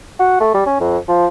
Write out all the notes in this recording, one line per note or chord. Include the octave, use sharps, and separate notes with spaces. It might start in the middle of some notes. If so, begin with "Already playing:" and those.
F#4
A3
G3
C#4
F2
F3